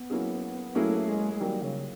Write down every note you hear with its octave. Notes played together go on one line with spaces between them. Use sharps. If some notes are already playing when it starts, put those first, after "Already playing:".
Already playing: B3
F#3 A#3 C#4 E4 G#4
F#3 A3 A#3 C#4 E4 G#4
G#3
G#3
D#3 F#3 G3 A#3
C#3